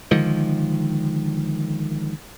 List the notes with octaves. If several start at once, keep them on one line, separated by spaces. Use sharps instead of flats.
D3 D#3 F3 G#3